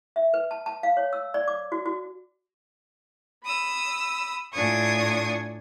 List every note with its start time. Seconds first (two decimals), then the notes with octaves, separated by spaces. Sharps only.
0.16 E5
0.34 B4
0.51 A5
0.66 A5
0.83 F5
0.97 C#5
1.13 E6
1.34 D5
1.48 D6
1.72 F#4
1.86 F#4
3.44 B5 D#6 E6
4.54 A2 D4 F4 G#5 C#6 D#6